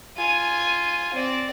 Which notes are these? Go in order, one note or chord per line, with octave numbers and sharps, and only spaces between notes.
F4 G#5 D#7
C4 D5